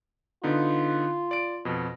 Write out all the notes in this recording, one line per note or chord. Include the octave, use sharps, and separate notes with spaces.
D3 B3 D#4 F4
D5 D7
F2 B2